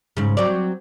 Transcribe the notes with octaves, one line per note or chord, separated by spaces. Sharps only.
G#2 C#3
F#3 C4 D5